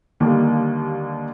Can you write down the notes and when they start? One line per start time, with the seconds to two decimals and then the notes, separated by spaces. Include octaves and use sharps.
0.20 D#2 D3 D#3 G3 A#3